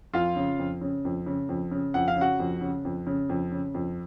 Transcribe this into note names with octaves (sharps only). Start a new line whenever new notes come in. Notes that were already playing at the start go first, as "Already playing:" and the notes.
F2 F4 F5
C#3
F2
C#3
F2
C#3
F2
C#3
F2 F#5
F5
C#3
F#4 F#5
F2
C#3
F2
C#3
F2
C#3
F2